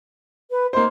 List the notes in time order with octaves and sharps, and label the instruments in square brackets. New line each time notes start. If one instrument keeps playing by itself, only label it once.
[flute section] B4
[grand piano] A#3 D#4 C5 [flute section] C6